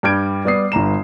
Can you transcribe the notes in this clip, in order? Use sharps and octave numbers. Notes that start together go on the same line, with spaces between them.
G2 G3 F6 G6 G#6 D7
G3 B3 D5 D#6 C7
G1 G2 A#5 E7